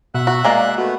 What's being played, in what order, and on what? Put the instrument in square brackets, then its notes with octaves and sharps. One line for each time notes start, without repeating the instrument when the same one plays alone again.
[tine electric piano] B2 [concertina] E5 F#5 F#6
[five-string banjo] F#4
[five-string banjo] G#3 A#3 [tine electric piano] D5
[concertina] A3 B3 [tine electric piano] F#4